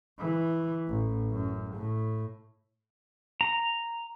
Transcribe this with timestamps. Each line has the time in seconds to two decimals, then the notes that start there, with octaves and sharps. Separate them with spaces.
0.19 E3
0.88 A1
1.31 F#2
1.75 A2
3.41 A#5